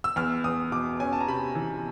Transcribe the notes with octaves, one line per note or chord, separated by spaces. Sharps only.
E6
E2 F6
E2 D#6
B2 D6
C#4 G#5
A5
A#5
C3 B5
E3